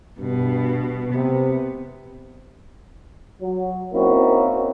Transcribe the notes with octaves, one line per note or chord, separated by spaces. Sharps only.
G2 B2
C3 B3
F#3
A#3 C4 C#4 D#4 E4 F#4